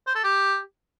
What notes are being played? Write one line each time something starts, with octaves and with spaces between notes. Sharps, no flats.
C5
A4
G4